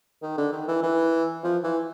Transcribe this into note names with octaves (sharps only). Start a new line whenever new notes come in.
D#3
D3
D#3
E3
E3
F3
E3